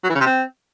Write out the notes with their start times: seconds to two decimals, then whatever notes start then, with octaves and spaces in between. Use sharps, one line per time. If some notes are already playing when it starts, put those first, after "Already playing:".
0.04 F#3
0.09 E3
0.15 C#3
0.21 C3
0.26 C4